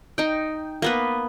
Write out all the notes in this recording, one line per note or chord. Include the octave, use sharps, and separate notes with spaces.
D#4 G5
A#3 B3 B4